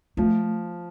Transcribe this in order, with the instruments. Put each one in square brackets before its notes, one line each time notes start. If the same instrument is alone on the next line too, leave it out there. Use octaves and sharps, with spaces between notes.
[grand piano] F3 [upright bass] A3